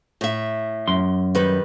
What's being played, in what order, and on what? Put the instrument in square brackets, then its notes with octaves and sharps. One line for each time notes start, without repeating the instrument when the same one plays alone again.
[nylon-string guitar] A2 E5
[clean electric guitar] F#2 C6
[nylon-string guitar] D#3 G3 B4